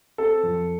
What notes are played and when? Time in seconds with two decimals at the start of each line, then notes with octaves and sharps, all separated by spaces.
0.18 C4 A4
0.43 F2